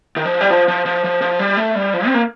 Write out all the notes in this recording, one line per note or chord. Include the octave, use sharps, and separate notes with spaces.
D#3
F3
G3
F3
F3
F3
F3
F3
G3
A3
G3
F3
C4
A#3